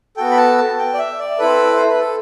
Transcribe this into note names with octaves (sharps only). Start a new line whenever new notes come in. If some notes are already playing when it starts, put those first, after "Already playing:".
B3 F#4 A4 G5
B5
A5
A5
G5
D5
E5
D5
C4 E4 A4 B4
C5
B4
A4